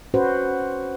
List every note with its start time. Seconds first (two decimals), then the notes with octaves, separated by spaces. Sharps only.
0.14 C#4 F#4 B4 C5